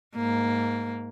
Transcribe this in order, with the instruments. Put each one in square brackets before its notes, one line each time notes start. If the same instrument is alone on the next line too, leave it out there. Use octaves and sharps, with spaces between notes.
[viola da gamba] G#2 A#3